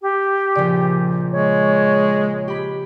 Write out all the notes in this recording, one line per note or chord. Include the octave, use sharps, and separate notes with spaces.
G4
A#1 C#3 F3 D5
G#3 C#5
G4 B5 B6